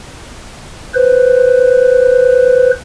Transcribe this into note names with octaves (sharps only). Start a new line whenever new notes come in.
B4 C5